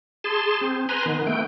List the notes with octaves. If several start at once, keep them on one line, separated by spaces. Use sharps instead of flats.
G#4 A5 C6
C4
B4 G#5 A#5 C6
D#3 B3
A3 B3 G5